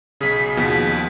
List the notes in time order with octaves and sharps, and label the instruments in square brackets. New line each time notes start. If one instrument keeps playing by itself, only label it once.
[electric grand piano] B1 C#3 [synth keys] G#4 B6
[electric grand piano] D#2 B2 F3